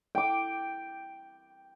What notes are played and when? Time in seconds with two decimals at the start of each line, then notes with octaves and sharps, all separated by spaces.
0.15 G5 D6